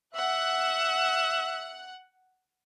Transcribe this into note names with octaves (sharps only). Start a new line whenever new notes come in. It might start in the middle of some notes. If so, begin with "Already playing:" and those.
E5 F#5 F#6